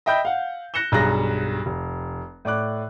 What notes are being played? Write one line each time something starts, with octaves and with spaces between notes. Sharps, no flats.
D#5 E5 G5 B5 G6
F5 F#5
F#6 A#6 C#7 E7 G7
B1 G2 G#4 A#5 F#6 A#6
F1
A2 D5 D6 F#6